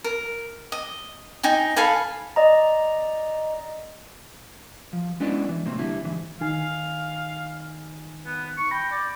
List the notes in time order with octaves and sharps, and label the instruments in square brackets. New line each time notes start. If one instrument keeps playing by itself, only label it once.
[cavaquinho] A#4
D#5
D#4 G5 G#5
A4 F5 G#5 B5
[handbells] D5 D#5 A#5
[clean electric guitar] F3
G#3 B3 C#4 D4 E4 D5
E3
E2 A2 C3 A#3 C4
D3 G3 E4
G#2 E3
[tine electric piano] D#3 D#4 G#5 [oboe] F5
[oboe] B3
C#6
[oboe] G5 [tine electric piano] B5 A#6
[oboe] D5